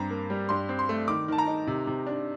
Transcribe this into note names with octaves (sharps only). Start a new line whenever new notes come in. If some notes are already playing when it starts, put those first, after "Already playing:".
Already playing: G2 C4 A#5
A#3
G3
G2 C6
C4
C6
A3
D#3 D6
D#3 A5
A#5
D#4
C3
C3
D4